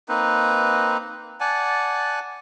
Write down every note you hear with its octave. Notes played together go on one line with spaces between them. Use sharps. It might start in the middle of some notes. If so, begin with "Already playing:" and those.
A#3 C4 D#4 B4
D5 F#5 G#5 A5